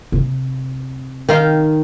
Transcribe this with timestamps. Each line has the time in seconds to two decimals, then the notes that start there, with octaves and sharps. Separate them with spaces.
0.12 C3
1.29 D#3 F5 G5